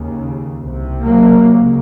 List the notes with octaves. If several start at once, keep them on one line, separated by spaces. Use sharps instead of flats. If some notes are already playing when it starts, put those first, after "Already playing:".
Already playing: D#2 C#3
C2 C3
F#3 A#3
C#2 C#3